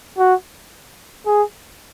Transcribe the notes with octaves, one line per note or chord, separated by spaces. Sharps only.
F#4
G#4